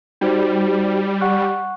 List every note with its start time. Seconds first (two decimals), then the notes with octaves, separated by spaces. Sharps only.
0.21 G3 D#4 F#4 C5
1.21 F#5 C#6 F#6